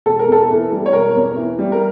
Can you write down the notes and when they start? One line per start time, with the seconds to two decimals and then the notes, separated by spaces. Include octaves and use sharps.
0.06 E1 A4
0.19 A#4
0.28 E2 A4
0.50 E3
0.72 G3
0.86 C#5
0.93 E1 A#4
1.16 E2
1.36 E3
1.59 G3
1.72 A#4